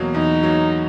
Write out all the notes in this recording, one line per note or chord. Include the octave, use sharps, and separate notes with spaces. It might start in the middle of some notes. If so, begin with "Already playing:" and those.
Already playing: E2 B2 F#3 A#3
E2 D#4
B2 F#3 A#3